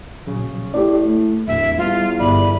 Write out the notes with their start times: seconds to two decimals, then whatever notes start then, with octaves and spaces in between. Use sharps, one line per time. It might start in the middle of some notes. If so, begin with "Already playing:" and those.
0.27 A#2 C#3 F#3
0.74 A2 G4 D5
1.05 A3
1.47 D1 E2 A2 E5
1.78 E2 G3 F4
2.19 G1 D5 E5 B5